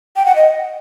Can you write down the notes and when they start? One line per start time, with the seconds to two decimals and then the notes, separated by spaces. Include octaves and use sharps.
0.16 G5
0.25 F#5
0.36 D#5